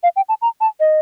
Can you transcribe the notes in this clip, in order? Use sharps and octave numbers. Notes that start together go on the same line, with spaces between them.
F5
G5
A5
A#5
A5
D#5